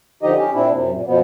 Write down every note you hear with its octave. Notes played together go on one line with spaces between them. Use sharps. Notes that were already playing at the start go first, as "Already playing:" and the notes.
D3 F3 D#4 G4 D#5
C#4 G4
A#2 C4 D4 E4
F#2 C3
A#2
F#2 B2 F3 B3